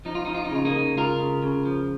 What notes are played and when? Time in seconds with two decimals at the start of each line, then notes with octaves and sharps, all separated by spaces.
0.05 F3 D#4
0.15 F4
0.25 F3 D#4
0.35 F4
0.45 D#4
0.51 C#3 F4
0.65 A#3 D#4
0.74 C#3
0.96 C#2 F4 A#4
1.20 C#3
1.43 C#3
1.65 F3